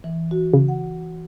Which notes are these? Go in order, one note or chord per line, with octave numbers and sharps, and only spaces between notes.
E3
F#4
C#3
F#5